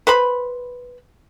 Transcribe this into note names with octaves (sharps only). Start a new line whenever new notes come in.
B4 C5 B5